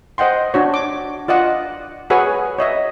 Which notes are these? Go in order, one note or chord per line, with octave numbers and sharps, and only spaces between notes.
C5 D#5 F#5 G5 C6
D4 F#4 C#5
D6
F4 D5 D#5 F#5
F#4 G#4 B4 C#5 F#5 G#5
C#5 D#5 E5